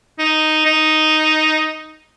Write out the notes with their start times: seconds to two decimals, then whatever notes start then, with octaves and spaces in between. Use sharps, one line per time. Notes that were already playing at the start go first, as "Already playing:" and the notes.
0.19 D#4
0.66 D#4